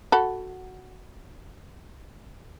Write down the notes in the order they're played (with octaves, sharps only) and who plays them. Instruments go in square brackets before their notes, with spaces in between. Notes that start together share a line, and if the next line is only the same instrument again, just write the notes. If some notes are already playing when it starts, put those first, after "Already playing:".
[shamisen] F#4 A4 B5